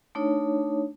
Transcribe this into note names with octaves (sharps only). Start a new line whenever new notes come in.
A3 D4 D#4 C#5